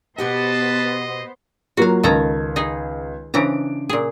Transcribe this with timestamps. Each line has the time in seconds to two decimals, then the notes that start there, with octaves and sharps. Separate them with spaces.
0.18 B2 B3 G4 B4 C5 D#5 F#5 A5
1.77 F#3 A#3 F4 F#4 F5
2.03 C#2 D#3 A4 A#5 G#6
2.56 D#4 G#4
3.34 C#3 E3 D4 C5 A#5 D7
3.89 A#2 G#4